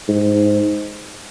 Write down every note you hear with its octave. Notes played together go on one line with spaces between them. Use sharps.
G#2